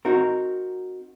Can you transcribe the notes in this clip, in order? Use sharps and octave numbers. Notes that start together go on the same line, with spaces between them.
C4 D#4 F#4 A#4